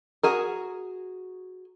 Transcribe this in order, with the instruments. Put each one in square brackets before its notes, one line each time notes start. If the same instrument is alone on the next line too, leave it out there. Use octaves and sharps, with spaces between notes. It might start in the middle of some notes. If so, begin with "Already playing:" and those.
[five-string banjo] F#4 G#4 A#4